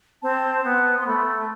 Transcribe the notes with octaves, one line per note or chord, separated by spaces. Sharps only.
C4 A5
B3
B3 C6
A3 B5